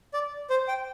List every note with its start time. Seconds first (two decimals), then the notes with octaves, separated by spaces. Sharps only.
0.14 D5
0.50 C5
0.68 G5